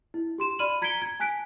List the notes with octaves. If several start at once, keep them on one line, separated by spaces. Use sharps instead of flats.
E4
G4 C6 E7
D5 B5 F6 D#7 F#7
A#5 G#6 B6 C#7 D7 G7
G#6
G#5 A5 F#6 B6 D7